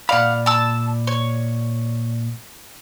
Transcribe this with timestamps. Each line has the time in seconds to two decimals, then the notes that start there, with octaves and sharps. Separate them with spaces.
0.09 A#2 D5 F5 F#5 B5
0.46 A5 E6
1.07 C#5